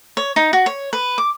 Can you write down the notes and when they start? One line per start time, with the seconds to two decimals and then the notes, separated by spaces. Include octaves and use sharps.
0.17 C#5
0.36 D#4
0.53 F#4
0.66 C#5
0.93 B4
1.18 D6